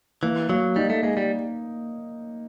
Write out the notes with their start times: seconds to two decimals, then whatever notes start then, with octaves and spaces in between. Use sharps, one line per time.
0.23 E3 A#3
0.49 F#3 A#3
0.76 G3 D#4
0.90 A3
1.03 G#3 A#3
1.17 G3